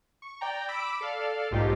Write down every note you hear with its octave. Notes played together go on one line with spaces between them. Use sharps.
C#6
D5 G5 A#5
B5 D6 E6 B6 D7
A4 D5 F5
B1 G#2 A3 D#4 F4 G4